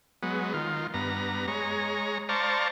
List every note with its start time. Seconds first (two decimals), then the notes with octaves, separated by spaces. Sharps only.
0.23 F#3 G#3 B3
0.54 D#3 F4
0.94 G2 B3 A#5
1.48 G#3 C#5 A#5
2.29 C5 D5 F5 A5 A#5 C#6